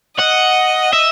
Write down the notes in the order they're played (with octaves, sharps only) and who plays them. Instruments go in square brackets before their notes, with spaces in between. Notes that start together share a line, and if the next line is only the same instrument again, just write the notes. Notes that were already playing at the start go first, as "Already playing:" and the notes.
[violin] D#5 [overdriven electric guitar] F#5
[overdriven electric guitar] E5